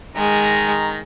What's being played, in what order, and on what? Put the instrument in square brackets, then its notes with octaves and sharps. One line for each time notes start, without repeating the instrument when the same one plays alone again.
[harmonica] D#3 A#5 [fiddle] G#3